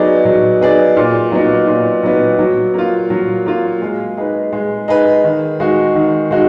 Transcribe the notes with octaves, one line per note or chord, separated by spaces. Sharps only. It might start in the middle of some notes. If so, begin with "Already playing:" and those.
Already playing: F#3 B3 D#4 G#4 D5
F#3
B3 D#4 G#4 D5
A#2
F#3 B3 D#4
A#2
F#3 B3 D#4
F#3
A#3 F4
F#3
A#3 F4
G#3
D#4 G#4 B4
G#3
D#4 G#4 B4
D#3
G#3 D#4 F#4
D#3
G#3 D#4 F#4